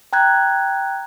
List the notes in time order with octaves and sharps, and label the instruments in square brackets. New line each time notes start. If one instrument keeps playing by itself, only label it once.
[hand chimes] G5 A#5 F#6 G#6